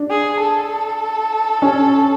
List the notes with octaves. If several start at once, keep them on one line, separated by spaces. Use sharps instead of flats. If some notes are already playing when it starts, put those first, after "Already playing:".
Already playing: D4
G#4
A4
C#4